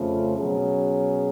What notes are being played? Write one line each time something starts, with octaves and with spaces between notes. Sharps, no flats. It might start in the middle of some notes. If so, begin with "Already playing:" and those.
Already playing: F2 C#3 F3 A3
B2 F#3 C#4 G#4